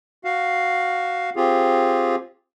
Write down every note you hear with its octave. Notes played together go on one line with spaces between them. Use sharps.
F#4 F5
C4 F4 G4 G#4